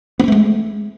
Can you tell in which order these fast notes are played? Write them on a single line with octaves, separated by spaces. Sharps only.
B3 C4 A3 G#3